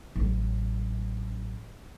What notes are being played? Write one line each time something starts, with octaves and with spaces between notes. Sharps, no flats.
A1 F#3